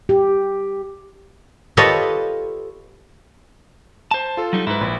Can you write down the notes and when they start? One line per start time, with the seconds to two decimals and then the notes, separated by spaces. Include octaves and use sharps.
0.09 G4
1.77 F4 G4 A4 B4 C#5 D#5
4.11 C5 A5
4.37 F4 A4
4.53 F#3 G3 D#4
4.67 G#2 E4 B4
4.81 A#1